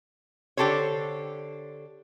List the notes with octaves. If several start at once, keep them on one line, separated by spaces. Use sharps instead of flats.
D3 G4 A4 C5 C#5